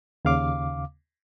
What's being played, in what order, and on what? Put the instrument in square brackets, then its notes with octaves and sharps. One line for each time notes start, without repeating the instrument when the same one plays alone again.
[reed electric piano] D#2 C#3 F5 D6